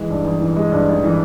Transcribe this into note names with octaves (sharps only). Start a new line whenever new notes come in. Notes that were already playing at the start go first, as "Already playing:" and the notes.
Already playing: E3 G#3
G2
A1
E3
G#3
G2
A1
E3